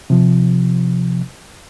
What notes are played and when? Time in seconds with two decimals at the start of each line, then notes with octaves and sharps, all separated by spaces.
0.10 C3 F3